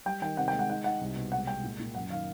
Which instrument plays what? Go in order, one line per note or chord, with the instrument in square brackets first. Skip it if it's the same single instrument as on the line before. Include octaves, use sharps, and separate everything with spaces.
[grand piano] G3 G5
D#3 G5
C3 F#5
G5
G#3
F#5
D#4 F#5
D#4 F#5
C2
B2
G#3 F#5
G#3 G5
A#2
A#2
F#2 F#5
D#3 F5